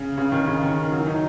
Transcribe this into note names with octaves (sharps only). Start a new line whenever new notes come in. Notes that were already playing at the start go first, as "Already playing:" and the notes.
Already playing: C#3
C#3
D#3
C#3
D#3
F#3
D#4